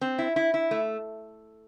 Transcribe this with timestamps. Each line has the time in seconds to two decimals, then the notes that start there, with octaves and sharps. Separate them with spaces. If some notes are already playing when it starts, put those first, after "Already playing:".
0.01 C4
0.19 E4
0.36 E4
0.54 E4
0.71 A3